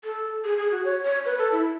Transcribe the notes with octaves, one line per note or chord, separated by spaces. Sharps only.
A4
G#4
G#4
F#4
C#5
C#5
B4
A4
E4